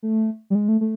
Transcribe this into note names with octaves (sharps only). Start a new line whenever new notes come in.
A3
G3
G#3
A3
A3